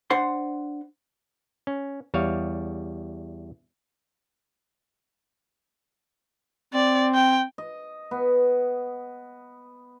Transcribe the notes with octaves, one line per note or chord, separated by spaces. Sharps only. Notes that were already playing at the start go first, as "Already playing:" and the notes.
D4 C5 F#5 C6
C#4
E2 G3 C#5 F5
C4 D5
G5
D#5
B3